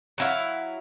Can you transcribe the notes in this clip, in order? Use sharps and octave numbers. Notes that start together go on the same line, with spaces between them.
F#3 E4 F5